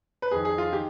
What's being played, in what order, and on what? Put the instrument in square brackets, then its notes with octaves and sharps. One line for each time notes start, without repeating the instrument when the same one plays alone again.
[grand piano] B4
F2 D#3 G#4
G#4
F4
D#3 G4